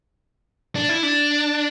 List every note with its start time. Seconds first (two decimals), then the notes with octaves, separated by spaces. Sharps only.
0.75 D4
0.89 E4
1.03 D4